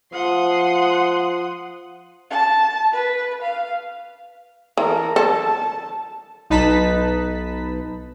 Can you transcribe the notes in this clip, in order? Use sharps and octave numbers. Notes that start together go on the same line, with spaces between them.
F3 F#5 C6 D#6
A5
B4
F5
E3 A4 A#4
A4 A5
B1 D#4 B4 A5 B5 B6